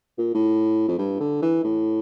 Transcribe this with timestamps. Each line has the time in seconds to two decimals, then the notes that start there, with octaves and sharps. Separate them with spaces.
0.18 A#2
0.35 A2
0.88 F2
0.99 G2
1.20 D3
1.42 E3
1.64 A2